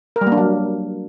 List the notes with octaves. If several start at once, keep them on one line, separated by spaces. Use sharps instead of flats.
A#4
G3
A#3
D4
F#3